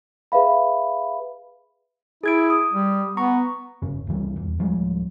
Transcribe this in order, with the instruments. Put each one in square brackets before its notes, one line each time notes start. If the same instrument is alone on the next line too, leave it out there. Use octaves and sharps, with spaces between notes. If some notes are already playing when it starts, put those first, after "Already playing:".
[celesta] G#4 B4 E5 F5 B5
[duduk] E4 [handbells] G#4 G#6 D7
[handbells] D#6
[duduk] G3
[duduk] B3 [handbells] A#5 C#6
[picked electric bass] G1 F#2 C#3
C#2 F#2 E3 G3
D#1 E2
D1 F3 G3 G#3